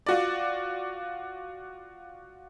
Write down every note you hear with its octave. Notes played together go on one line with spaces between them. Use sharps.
F4 F#4 D5